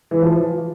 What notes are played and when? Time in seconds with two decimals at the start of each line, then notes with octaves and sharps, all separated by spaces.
0.11 E3
0.22 F3